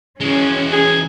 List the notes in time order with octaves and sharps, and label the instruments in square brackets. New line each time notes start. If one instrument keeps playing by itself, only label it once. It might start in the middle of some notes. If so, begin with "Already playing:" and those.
[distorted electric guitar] E3 G#3 [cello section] C#4
[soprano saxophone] G#4